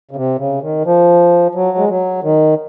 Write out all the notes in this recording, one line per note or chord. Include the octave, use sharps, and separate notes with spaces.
C#3
C3
C#3
D#3
F3
F#3
G#3
F#3
D#3